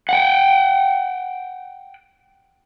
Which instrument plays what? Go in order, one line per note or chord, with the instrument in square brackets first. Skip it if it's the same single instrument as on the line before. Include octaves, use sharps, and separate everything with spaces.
[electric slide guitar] F#5 G5